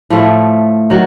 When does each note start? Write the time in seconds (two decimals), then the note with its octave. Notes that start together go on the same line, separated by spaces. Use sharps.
0.10 A2 F3 A3
0.90 D#3 F#3